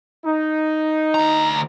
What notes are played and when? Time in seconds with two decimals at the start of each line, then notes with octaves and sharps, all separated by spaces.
0.24 D#4
1.15 D2 A#5